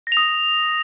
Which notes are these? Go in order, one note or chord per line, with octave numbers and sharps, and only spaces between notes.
D#6 A#6 F7